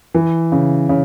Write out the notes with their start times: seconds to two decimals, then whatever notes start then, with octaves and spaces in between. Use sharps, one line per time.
0.14 E3
0.52 C#3
0.89 C#3